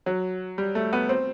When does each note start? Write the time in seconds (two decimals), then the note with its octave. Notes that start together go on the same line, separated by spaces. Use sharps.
0.06 F#3
0.58 G3
0.75 A3
0.93 B3
1.09 C4